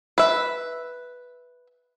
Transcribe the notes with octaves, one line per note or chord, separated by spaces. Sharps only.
B4 E5